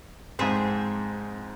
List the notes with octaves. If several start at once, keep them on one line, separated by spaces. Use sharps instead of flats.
F2 G#2 C4 G#4 E5